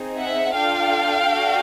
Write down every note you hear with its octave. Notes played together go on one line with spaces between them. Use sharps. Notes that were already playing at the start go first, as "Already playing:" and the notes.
Already playing: C4 D#4 G#4
E5 F#5
D4 F4 A4 F5 G5
D4 F#4 A4